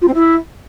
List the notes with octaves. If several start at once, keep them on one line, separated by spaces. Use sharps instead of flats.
F4
C4
E4